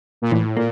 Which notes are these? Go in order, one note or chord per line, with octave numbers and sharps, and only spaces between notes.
A#2
A2 E3
A#2 A#3